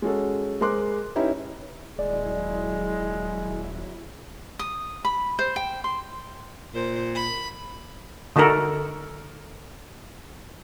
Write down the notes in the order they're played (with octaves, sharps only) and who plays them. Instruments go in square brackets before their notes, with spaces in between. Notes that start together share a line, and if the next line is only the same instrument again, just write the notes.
[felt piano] G#3 C#4 F#4 A4
G#3 A#4 C5 C6 D6 F#6
C#4 D#4 E4 G4 B4 C#5
[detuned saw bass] D#1 [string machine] F#3 E4 [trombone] G#3 [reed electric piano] D5
[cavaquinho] D#6
B5
C5
G5
C6
[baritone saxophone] A#2 [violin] C5
[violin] B5
[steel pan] D3 D#4 F#4 A4 A#4